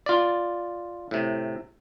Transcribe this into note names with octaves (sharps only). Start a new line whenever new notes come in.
F4 D5
A2 C3